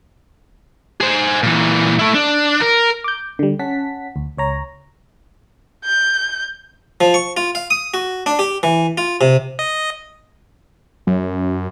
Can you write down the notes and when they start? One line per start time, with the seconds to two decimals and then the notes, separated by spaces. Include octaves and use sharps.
1.01 G#4 C5
1.43 A#2 E3
1.99 A3 E4
2.14 D4
2.61 A#4
3.04 D6 G6
3.39 D3 G3
3.59 C#4 F#5 A5 B6
4.16 D2
4.37 C#2 C#5 A#5
5.85 G6
7.01 F3
7.14 C#6
7.37 F4
7.55 F5
7.70 D#6
7.94 F#4
8.26 D4
8.39 G4
8.63 E3
8.98 F4
9.21 C3
9.59 D#5
11.07 F#2